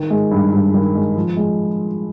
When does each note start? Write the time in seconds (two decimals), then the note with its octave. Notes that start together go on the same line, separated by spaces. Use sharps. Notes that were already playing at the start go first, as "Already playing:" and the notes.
Already playing: D#3
0.10 G#3
0.31 G2
0.52 G2
0.74 D#3
0.95 G#3
1.16 F3
1.37 G#3